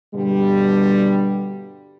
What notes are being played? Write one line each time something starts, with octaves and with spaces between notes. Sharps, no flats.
G2 B2 D3 G3